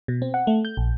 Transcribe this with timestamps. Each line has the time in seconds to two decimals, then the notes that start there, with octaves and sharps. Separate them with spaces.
0.08 B2
0.22 C4
0.34 F#5
0.47 A3
0.65 G6
0.77 A#1